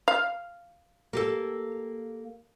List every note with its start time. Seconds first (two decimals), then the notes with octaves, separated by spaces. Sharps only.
0.08 F5
1.13 A#3 G4 A4